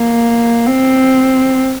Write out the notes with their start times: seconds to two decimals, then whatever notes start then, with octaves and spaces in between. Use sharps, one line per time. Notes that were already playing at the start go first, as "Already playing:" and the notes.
Already playing: A#3
0.66 C4